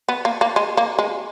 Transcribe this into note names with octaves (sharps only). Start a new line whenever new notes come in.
B3
A#3
A#3
G#3
A#3
G#3